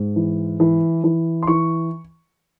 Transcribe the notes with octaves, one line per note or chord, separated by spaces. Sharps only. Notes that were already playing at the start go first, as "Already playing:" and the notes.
Already playing: G#2
E3
E3
E3
C6
E3 C#6